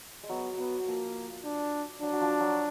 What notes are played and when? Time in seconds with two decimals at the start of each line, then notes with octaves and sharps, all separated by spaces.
0.23 G#3
0.29 F#3 B3
0.58 F#3 B3
0.87 F3 A#3
1.44 D4
2.02 F#3 D4
2.13 F#3
2.21 F3
2.40 F#3